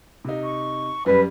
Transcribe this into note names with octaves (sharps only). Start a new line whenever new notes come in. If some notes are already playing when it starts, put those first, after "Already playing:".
C3 D#4
C#6
F#2 G3 B4